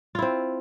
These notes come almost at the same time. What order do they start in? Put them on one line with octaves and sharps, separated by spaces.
F4 E4 C4